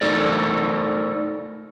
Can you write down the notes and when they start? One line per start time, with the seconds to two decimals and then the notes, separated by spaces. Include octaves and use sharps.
0.01 A3 D#4 A4 A#4 D5